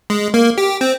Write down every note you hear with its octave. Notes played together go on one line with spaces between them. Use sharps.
G#3
A#3
G4
C4